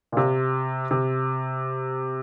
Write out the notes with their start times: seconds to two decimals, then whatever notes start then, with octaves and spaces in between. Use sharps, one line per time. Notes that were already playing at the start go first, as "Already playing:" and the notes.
0.12 A#2
0.17 C3
0.91 C3